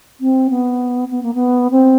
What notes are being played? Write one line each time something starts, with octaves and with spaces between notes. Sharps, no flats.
C4
B3
B3
A#3
B3
C4